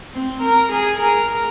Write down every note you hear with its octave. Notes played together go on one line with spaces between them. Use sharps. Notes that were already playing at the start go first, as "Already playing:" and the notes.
C4
A#4
G#4
A#4